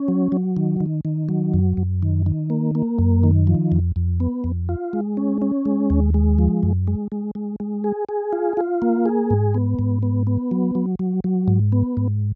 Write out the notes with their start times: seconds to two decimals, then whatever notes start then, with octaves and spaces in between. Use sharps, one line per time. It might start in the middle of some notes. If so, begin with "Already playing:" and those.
Already playing: C#4
0.08 F#3
0.32 F#3
0.57 D#3
0.81 D#3
1.05 D#3
1.29 F#3
1.54 F#2
1.77 F#2
2.02 D#3
2.26 D#3
2.50 A#3
2.75 A#3
2.99 F#2
3.23 D#3
3.47 F3
3.72 F2
3.96 F2
4.20 B3
4.44 F2
4.69 F4
4.93 G#3
5.17 C#4
5.42 C#4
5.65 G#3
5.90 D#2
6.14 G#3
6.39 F3
6.63 F#2
6.87 G#3
7.12 G#3
7.35 G#3
7.60 G#3
7.84 G#4
8.09 G#4
8.33 F4
8.57 F4
8.82 A#3
9.06 G#4
9.30 G#2
9.54 B3
9.79 G#2
10.03 B3
10.27 B3
10.51 F#3
10.75 F#3
10.99 F#3
11.24 F#3
11.48 G#2
11.72 B3
11.97 G#2